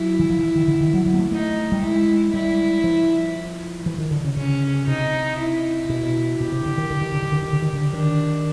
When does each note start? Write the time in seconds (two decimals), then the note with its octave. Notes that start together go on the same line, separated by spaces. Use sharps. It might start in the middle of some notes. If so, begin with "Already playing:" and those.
Already playing: F#3 E4
0.20 E3
0.30 F3
0.44 E3
0.56 D#3
0.68 D3
0.81 D#3
0.93 F#3
1.06 F#3
1.14 A#3
1.19 A3
1.32 A3 D#4
1.72 G3
1.82 G#3 E4
2.33 G3 E4
2.84 F3
3.86 E3
3.98 D#3
4.11 D3
4.24 C#3
4.36 C#3 C#4
4.87 C3 D#4
5.39 E4
5.90 B2
6.40 B2 G4
6.52 C3
6.66 D3
6.78 D#3
6.90 D3
7.01 D#3
7.12 D3
7.22 D#3
7.32 D3
7.42 D#3
7.53 D3
7.62 D#3
7.73 D3
7.92 D#3 D4